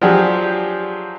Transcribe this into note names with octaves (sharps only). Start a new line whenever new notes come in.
F3 F#3 D4 G4 G#4